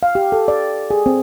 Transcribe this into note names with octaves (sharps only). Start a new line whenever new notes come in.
F5
G4
A4
D5
G#4
C4